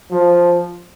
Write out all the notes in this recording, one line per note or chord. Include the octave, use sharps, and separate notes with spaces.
F3